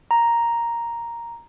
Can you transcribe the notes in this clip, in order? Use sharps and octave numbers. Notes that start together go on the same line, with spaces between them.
A#5